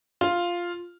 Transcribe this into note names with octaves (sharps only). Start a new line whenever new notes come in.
F4